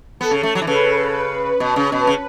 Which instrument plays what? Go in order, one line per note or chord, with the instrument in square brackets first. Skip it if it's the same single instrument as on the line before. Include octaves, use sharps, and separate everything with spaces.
[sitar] B3 [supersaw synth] A4
[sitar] C#3
A3
F#3
E3
[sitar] C#3 [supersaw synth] B4
[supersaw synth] B4
[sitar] B2
C#3
B2
C#3